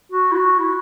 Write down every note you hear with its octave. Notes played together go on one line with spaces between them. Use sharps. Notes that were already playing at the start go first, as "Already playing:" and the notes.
F#4
E4
F#4
E4